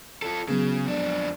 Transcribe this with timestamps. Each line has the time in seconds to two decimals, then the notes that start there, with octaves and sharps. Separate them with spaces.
0.22 F4 A4
0.48 C#3 F#3 B3 G#4
0.86 F2 D4